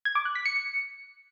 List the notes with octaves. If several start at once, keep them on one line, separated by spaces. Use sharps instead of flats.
G#6
D6
F#6
B6
C#7